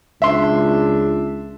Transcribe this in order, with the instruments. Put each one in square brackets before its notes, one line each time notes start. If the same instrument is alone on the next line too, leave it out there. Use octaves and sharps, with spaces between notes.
[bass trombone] C#2 [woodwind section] D4 [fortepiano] E5 C6